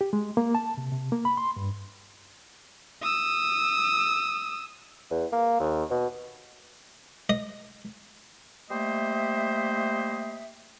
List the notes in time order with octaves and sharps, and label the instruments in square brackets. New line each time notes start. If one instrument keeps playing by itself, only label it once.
[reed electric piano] G4
G#3
A#3
A5
C3
C3
A#3
B5
C6
G2
[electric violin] D#6 E6
[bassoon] E2
A#3
D#2
B2
[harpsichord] D#5
[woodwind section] G3 A3 A#3 C5 D#5 E5